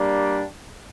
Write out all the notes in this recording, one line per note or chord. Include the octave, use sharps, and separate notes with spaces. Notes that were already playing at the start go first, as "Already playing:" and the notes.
Already playing: G3 A#3 D4